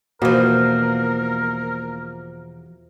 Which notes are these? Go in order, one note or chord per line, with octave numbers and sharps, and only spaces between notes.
E2 B2 F3 A#3 A#4